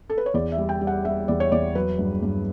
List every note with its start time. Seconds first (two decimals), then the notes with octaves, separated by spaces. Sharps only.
0.10 A4
0.18 B4
0.26 C#5
0.34 E2 D5
0.52 E5
0.58 G3
0.69 G5
0.81 G3
0.87 F#5
1.05 G3 E5
1.28 E2 D5
1.40 C#5
1.52 E2 D5
1.75 F#3 B4
1.99 G2
2.23 G2